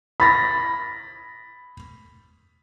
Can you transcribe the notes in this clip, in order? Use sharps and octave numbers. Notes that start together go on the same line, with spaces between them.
B5 A6 A#6